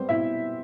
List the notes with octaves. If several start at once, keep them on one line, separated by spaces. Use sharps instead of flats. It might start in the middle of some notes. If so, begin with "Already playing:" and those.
Already playing: G3 B3 C4 C5
B2 E4 E5